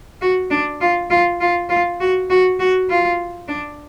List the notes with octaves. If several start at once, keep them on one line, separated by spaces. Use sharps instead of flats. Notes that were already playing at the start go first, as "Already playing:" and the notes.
F#4
D4
F4
F4
F4
F4
F#4
F#4
F#4
F4
D4